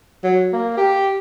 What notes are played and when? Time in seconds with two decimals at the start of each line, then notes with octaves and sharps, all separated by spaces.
0.24 F#3
0.53 A#3
0.77 G4